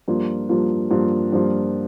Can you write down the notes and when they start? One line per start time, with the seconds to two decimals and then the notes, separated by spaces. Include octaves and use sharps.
0.08 G2 F3 A#3 F4
0.49 G2 F3 A#3 F4
0.91 G2 F3 A#3 F4
1.32 G2 F3 A#3 F4